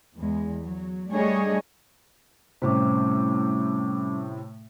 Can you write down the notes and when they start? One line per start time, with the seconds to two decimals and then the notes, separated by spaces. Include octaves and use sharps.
0.18 E2 G#3
0.62 F#3
1.10 G3 A3 D4 G#4 C#5 D#5
2.62 A2 C3 G3 C#4 D6